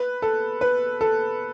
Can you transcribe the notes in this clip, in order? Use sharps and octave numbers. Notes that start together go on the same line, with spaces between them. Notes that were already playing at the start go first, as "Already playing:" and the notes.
Already playing: B4
A4
B4
A4